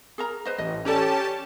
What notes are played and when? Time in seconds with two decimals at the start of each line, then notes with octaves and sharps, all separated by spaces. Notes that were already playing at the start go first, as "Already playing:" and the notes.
0.18 G#4 A#4 A#5
0.45 B4 C5 D#5
0.58 A1 D#5
0.85 C#4 G4 A4 D5 A5 A#5